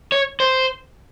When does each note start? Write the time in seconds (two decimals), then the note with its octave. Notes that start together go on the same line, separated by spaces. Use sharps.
0.12 C#5
0.40 C5